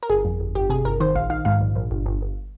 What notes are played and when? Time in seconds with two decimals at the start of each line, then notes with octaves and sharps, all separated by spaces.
0.03 A#4
0.10 G1 G#4
0.25 F2
0.40 G1
0.55 G1 G4
0.70 C3 G#4
0.85 G1 A#4
1.00 D#3 C5
1.15 A#1 F5
1.30 D#3 F5
1.45 G#2 F5
1.61 A#1
1.75 A#1
1.91 G1
2.06 G1
2.21 G1